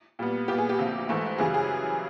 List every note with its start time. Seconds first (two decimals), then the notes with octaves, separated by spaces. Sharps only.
0.19 A#2 G3 B3
0.48 A#2 G3 B3 G4
0.58 G#4
0.69 G4
0.79 D2 C3 F3 A#3
1.09 G#2 E3 A3
1.38 F#2 C#3 E3 G3 G#4
1.54 G#4